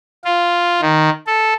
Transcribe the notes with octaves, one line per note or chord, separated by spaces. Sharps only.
F4
D#3
A4